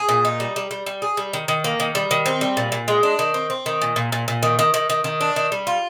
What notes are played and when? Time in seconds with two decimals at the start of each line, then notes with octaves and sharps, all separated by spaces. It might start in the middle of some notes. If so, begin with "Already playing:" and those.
Already playing: G#4
0.09 A#2
0.25 D#4
0.40 G3
0.56 G3
0.71 G3
0.86 G3
1.02 G#4
1.17 G3
1.33 D#3
1.48 D#3
1.64 A#3
1.80 D#3
1.95 G3
2.11 D#3
2.26 C4
2.41 G3
2.57 A#2
2.72 A#2
2.88 G#3
3.03 D4
3.19 D#3
3.34 C4
3.50 C4
3.66 D#3
3.82 A#2
3.96 A#2
4.12 A#2
4.28 A#2
4.43 D#3
4.59 D#3
4.74 D#3
4.90 D#3
5.04 D#3
5.21 D4
5.36 D#3
5.52 G3
5.67 F4